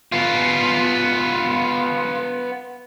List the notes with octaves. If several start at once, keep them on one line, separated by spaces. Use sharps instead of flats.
B3 F4